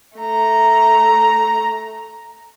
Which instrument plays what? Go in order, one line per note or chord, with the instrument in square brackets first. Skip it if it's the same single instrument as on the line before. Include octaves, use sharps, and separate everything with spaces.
[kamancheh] A3 A#5